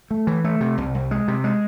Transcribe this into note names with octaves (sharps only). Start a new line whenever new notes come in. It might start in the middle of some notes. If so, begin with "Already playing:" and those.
A3
E3
A3
C3
C2
C2
G#3
C3
G#3